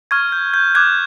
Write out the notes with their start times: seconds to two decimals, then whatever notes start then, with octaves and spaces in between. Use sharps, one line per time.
0.11 C#6 F6 G#6
0.32 G6
0.54 G6
0.75 D6 F#6 G#6